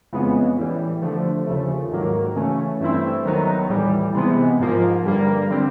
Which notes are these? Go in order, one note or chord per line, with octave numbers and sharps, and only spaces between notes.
F2 C#3 E3 G#3 B3
A2 E3 G3
D3 F3 A3
D#2 C#3 F3 A3
G#2 D#3 F#3 A#3
C#3 E3 A3 C#4
G2 E3 A3 C4 E4
D#2 D#3 F#3 B3 D#4
A2 E3 G3
C3 E3 G#3 B3
G#2 F3 A#3
G2 D3 G3 A#3
D3 G3 C4